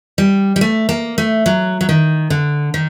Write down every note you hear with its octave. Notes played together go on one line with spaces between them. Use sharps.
G3
G3
A3
A#3
A3
F#3
F#3
D#3
D3
D#3